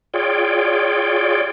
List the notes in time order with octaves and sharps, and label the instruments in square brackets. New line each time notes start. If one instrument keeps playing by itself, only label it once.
[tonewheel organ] F4 G#4 C#5 D5 G5